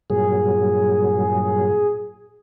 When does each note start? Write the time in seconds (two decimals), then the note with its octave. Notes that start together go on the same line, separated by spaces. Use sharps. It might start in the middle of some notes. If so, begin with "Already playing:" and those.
0.10 G2 A#2 F#3 G#4